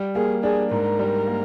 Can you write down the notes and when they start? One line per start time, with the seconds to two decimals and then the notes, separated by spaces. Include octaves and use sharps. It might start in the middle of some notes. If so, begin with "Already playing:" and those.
Already playing: G3
0.15 A#3 G#4
0.43 D4 G#4
0.71 G#2 A#4
0.99 G3
1.27 A#3